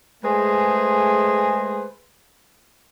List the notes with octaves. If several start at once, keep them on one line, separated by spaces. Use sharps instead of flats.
G#3 A3 G#4 B4 C5